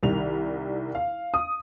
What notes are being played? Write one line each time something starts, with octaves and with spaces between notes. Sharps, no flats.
C2 D#3 G3 F7
F5
D#6